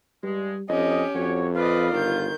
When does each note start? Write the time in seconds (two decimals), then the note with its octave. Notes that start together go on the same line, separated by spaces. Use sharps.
0.23 G2 G3 G#3
0.69 F2 C#4 G4 D#5
1.15 F2 F#4 C#5
1.56 F4 B4 D5 D#5
1.92 G1 D#3 G6